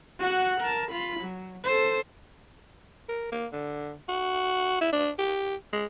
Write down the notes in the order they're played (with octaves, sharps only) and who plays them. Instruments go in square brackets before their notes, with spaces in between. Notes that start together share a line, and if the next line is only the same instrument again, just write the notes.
[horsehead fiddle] F#4 F#5
A#4 A5
F4 B5
F#3
A4 C5
[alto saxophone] A#4
A#3
D3
F#4
E4
D4
G4
G#3